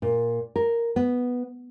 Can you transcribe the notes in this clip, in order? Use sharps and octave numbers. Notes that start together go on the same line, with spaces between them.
A#2
A#4
B3